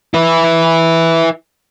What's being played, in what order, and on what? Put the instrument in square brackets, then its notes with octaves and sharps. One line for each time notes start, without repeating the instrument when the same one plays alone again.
[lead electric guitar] E4 B4